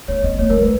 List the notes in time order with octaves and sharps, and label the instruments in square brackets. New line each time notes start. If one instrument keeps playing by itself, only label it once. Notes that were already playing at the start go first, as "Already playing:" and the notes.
[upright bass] B3 [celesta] C#5
[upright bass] B3 [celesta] D#5
[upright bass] A#3 [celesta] C#5
[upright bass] G#3 [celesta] A#4
[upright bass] G#3 [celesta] B4